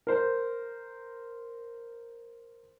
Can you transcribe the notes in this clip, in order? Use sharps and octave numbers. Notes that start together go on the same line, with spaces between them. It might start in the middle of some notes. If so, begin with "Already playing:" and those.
A#4 C5